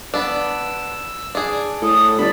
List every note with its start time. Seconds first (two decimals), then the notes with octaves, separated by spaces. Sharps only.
0.14 B3 D4 E6
1.35 D4 G#4
1.82 A2 A4 D#6
2.19 G1 D5 B5